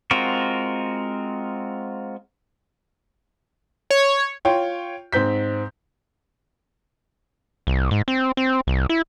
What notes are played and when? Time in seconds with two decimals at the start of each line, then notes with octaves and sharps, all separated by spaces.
0.11 G#3 C4 F4 F#4 A#4
3.91 C#5
4.45 F4 C#5 G5
5.12 G#2 C4 G6 B6
7.67 C2
7.91 G#2
8.08 C4
8.37 C4
8.67 C2
8.89 E4